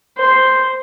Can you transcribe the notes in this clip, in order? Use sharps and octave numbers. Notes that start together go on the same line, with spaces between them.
C5